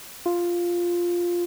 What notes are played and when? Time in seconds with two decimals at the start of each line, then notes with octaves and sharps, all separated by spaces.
0.26 F4